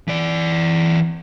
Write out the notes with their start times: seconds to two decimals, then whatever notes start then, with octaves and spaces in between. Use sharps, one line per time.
0.08 E3 D5